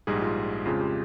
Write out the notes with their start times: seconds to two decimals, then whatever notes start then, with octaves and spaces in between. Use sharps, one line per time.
0.07 A#1 G#2 G3 G#4
0.21 F4
0.65 F2 C#3 F3 G#3 F4
0.80 G4